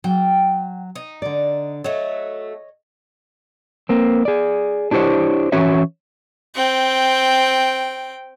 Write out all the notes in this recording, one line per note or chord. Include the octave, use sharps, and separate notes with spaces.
F#3 G5
D#4
D3 D5
F#3 A3 C#5 D#5
A#3 C4
G#4 D5
D4 E4 G4 C5 C#5
E3 C#4 F#4 C#5 E5
C4 G5